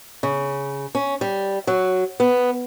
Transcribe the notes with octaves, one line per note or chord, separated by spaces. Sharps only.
C#3
C#4
G3
F#3
B3